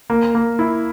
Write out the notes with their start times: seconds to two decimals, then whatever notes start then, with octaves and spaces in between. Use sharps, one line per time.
0.10 A#3
0.35 A#3
0.59 E4